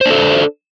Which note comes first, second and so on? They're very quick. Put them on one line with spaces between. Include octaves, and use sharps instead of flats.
C5 D4 A4